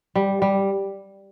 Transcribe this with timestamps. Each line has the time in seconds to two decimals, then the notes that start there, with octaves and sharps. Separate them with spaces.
0.15 G3
0.42 G3